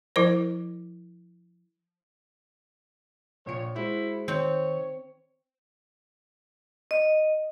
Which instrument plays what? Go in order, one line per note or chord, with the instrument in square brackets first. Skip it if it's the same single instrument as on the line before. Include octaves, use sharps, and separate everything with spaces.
[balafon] F3 E4 A#4 C5
[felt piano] A#1 A#2 C#7 [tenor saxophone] C#5
[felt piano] G#3 F#4 C5 [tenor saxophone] E4
[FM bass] D#3 [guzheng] C4 [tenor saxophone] C#5 [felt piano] C#7
[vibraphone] D#5